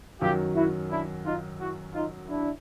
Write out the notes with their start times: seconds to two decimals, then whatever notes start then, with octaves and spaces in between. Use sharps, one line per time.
0.21 F#2 D#3 F#3 F4 G4
0.56 E4 F#4
0.91 D4 E4
1.25 D#4 F4
1.60 E4 F#4
1.94 D#4 F4
2.29 D4 E4